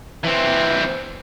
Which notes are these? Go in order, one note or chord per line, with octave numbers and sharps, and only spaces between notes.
E3 C4